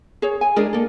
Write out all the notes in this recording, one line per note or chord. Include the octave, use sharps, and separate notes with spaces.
G#4 C#5
G#5
G#3 D4 G#4 A#4
A#3 A4